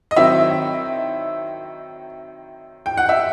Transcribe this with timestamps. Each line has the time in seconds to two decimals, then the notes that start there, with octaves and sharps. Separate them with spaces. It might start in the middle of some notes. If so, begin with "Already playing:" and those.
0.11 D#5
0.16 D#3 F#3 C4 E4 E5
2.86 G5
2.97 F#5
3.09 E5